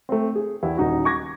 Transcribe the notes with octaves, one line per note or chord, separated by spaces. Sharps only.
A3 C4
G#4
E2 E4 G4 F#5
D#1 D#4 F#4
C#6 D6 G#6 A#6